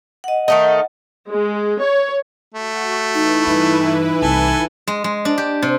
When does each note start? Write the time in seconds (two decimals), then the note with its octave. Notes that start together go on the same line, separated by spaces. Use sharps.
0.24 D#5 F#5
0.48 D#3 A3 D#4
1.29 G#3
1.80 C#5
2.55 A3 F#4
3.14 E3 D#4 E4 B4
3.47 G2 D#4
4.22 C2 C4 A4 G#5
4.88 G#3
5.04 G#3
5.25 D4
5.38 G4
5.62 C3